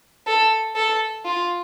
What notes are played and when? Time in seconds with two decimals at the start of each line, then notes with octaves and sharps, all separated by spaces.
0.27 A4
0.76 A4
1.25 F4